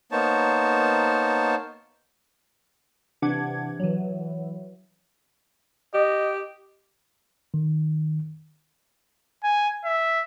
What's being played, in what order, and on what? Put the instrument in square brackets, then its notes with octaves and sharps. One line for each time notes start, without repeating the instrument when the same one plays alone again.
[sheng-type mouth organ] A#3 B3 D#4 C5 C#5 A5
[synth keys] C3 E3 D4 F#5 D6 G#6
E3 F#3
[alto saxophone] G4 [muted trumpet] D#5
[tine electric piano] D#3
[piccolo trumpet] G#5
E5